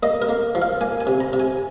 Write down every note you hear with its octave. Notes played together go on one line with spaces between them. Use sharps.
A#3 D#5
A#4
A#3
F3
F5
A#3 G#5
G#5
C3
A#5
C3
G#5